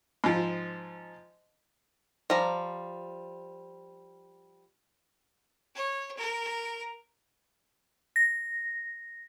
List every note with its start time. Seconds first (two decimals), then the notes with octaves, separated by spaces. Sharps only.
0.24 G#2 F3
2.30 F3 G3 A#5
5.75 C#5
6.17 A#4
8.16 A#6